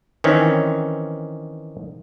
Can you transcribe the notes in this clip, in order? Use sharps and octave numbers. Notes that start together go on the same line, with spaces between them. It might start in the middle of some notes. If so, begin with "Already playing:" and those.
D#3 E3 C4 C#4